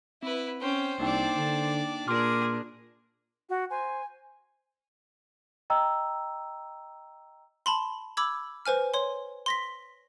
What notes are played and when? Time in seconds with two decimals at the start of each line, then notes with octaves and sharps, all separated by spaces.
0.23 C4 E4 B4
0.61 C#4 C5 G5
1.00 C2 A#3 D4 D#4 D5 G5
1.36 D3
2.08 A#2 D4 G#4 A#4 C6 D6 F6
3.49 F#4
3.70 C5 G#5
5.70 D#5 G5 A#5 E6
7.66 A5 B5 C6
8.17 B5 D6 E6 G#6
8.66 B4 C5 G#5 F6
8.94 C#5 C6
9.46 C6 A#6 B6